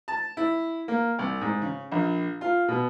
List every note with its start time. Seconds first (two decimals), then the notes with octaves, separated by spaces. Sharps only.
0.08 A5
0.37 E4
0.88 A#3
1.19 C2
1.41 G#2
1.62 C#3
1.92 A#1
2.41 F4
2.68 B2